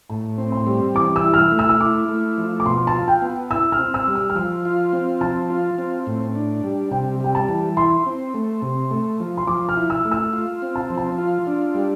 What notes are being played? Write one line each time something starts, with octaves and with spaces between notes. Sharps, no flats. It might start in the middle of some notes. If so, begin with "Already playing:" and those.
A2 A5
C4
C6
G3
E3 D6
E6
E4
F6
E6
A3
E6
E6
E4 D6
A3
F3
D6
B2 C6
A5
F4
G5
B3
E4 E6
F6
C4
E6
G3
E6
F6
F3 E6
F4
C4
F3 A5
F4
C4
A2
D4
G3
C3 G5
G3 G5
A5
E3
E4 C6
C4
A3
C3
A3
F3
C6
F3 D6
F6
E4
E6
A3
E6
F4
C4
A5
F3
A5
F4
D4
G3